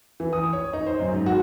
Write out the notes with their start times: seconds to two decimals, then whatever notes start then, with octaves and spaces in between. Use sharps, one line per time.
0.20 E3
0.33 D#6
0.53 C#5
0.73 D#4
0.86 C5
1.00 F#2
1.13 G#2
1.26 F#4